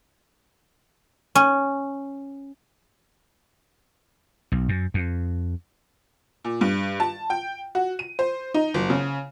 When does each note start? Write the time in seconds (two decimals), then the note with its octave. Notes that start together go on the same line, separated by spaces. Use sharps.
1.35 C#4
4.52 B1
4.69 F#2
4.94 F2
6.44 A#2
6.61 G2
7.00 A5
7.30 G5
7.75 F#4
7.99 D#7
8.19 C5
8.54 D#4
8.74 F#1
8.90 C#3